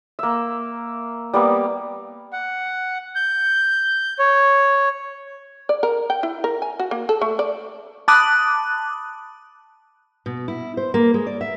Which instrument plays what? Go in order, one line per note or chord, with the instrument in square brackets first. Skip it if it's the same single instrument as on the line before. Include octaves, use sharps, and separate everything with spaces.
[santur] A#3 E5
G3 A#3 B3
[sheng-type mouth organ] F#5
G6
C#5
[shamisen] D5
A#4
G5
E4
A#4
G#5
F#4
A#3
A4
A3
D5
[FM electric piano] A5 B5 D6 D#6 F#6
[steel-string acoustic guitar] B2
E4
C5
A#3
G#3
D5
E5